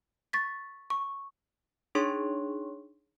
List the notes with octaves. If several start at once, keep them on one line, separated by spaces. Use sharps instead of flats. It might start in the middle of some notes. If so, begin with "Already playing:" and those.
C#6 A6 B6
C#6
D4 D#4 G#4 C#5 C6 C#6